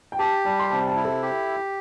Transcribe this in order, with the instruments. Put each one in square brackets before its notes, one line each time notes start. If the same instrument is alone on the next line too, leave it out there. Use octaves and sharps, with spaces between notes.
[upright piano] G5
[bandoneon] G4 [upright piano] A5
[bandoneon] G3 [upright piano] A5
[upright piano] C6
[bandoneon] C3 [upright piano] A5
[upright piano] A5
[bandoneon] E4
[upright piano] A4
[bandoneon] G4